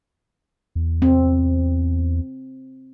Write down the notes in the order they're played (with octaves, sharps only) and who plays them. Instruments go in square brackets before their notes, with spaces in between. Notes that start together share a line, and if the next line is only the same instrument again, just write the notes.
[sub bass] E2
[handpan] C4